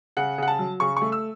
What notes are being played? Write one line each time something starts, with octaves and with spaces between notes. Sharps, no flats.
C#3 F#5
C#3 F#5
A5
F#3
C#3 C#6
C#6
A3
E6